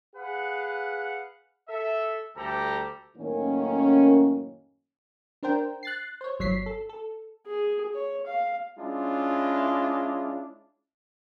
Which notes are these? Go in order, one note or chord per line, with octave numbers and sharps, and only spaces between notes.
G#4 B4 F5 F#5
A4 E5
D2 G3 G4 A4 A#5
F#2 A2 D#3 A#3 C#4
D4 A#4 C5 G5
F#6 A6 C7
C5 C#5
G1 F#3 C#5 B6 C7
A4
A4
G#4
C#5
F5
G#3 C#4 D4 E4 F4